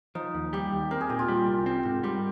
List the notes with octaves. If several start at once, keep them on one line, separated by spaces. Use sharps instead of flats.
F3 D#4
D#2
G3 G4
D#2
C4 A#4
G#4
A#2 G4
F4
G3
C2
C4
G#2
G3 G4